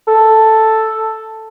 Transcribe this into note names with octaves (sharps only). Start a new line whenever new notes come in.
A4